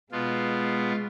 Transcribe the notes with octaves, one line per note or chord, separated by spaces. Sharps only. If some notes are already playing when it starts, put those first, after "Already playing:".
B2 G#3 B3 F4